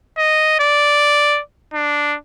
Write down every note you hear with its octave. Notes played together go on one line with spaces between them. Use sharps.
D#5
D5
D4